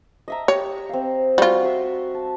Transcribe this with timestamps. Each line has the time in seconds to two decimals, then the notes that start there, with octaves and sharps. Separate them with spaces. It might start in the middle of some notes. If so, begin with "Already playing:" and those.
0.28 D#5 E5 A#5
0.48 G4 C#5
0.89 C4 F5
1.38 G3 F4 F#4
1.63 E5 C6
2.15 A5